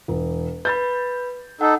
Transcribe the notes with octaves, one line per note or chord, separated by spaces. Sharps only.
E1
B4 B5 G6 A6
D#4 A4 F#5